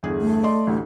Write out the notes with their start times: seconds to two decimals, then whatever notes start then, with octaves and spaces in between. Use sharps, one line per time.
0.03 G1 E2 G#4
0.20 A3
0.43 D5 D#5 C6
0.67 A1 D2 G4